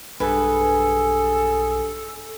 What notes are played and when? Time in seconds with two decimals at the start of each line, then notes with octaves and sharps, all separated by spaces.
0.20 B1 G2 G#4 A4 B4 G#5